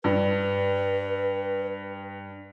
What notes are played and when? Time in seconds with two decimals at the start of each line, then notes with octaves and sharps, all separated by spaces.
0.04 G2 B4